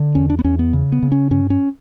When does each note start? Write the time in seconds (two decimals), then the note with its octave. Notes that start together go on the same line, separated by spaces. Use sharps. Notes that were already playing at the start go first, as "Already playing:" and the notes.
Already playing: D3
0.15 E2 C#4
0.30 D4
0.39 B3
0.44 E2 C#4
0.59 B3
0.73 C#3
0.92 B3
1.03 C#3
1.12 C#4
1.31 G2 C#4
1.50 C#4